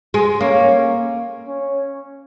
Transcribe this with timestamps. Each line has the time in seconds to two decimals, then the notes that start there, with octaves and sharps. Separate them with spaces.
0.14 G#3
0.41 A#3 C#4
1.47 C#4